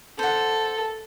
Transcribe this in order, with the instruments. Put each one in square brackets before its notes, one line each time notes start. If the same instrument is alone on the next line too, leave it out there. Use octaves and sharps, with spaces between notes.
[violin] A4 [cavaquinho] C5 F#5